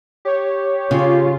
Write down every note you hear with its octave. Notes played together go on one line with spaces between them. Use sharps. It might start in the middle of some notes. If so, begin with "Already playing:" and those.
G4 C#5
C#3 F4